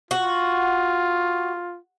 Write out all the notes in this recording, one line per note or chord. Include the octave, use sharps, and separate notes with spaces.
F4 F#4